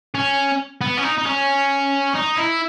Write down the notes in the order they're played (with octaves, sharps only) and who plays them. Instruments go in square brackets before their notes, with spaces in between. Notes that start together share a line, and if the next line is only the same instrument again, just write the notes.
[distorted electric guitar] C#4
B3
C#4
D#4
D#4
C#4
D#4
E4